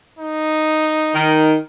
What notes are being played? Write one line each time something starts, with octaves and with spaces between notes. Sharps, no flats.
D#4
D#3